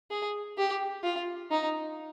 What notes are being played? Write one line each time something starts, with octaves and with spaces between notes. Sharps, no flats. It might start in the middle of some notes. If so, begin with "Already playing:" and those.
G#4
G4
F4
D#4